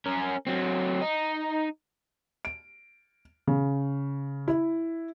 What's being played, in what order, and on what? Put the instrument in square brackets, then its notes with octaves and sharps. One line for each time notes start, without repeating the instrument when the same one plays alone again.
[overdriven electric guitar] C#4 A#4
F#3 C4
D#4
[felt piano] D7
C#3
E4